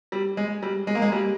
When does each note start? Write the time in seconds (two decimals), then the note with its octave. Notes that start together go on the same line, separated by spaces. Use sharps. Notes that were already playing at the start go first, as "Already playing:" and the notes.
0.12 G3
0.37 G#3
0.62 G3
0.87 G#3
0.95 A#3
1.02 G#3
1.12 G3